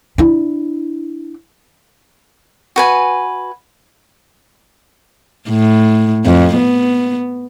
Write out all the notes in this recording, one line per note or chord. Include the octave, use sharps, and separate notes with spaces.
D4 E4
F#4 B4 G#5
A2
F2
B3